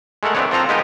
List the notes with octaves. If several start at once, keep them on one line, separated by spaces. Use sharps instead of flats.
G#3 A3 A4 A#4 F#5
E3 B3 C4 D4 B4 C#5
F3 C4 F4 A4 A#5
G#3 B3 D#4 G4 A#4 D#5